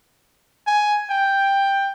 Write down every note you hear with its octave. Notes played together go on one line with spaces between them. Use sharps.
G#5
G5